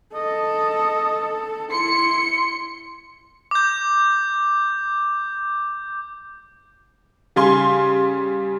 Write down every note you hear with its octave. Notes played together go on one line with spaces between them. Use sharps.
A4 D#5
E4 C6 C#7
D6 G6
C#3 G3 F5 G#5 C6